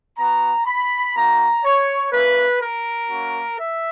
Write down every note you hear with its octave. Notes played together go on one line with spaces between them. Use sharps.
B3 F#4 A#5
B5
A#3 D#4 F#4 A#5
C#5
A#3 C#4 E4 B4
A#4
A#3 C#4 F#4
E5